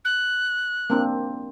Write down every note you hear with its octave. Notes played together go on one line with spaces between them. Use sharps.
F#6
A#3 C4 D4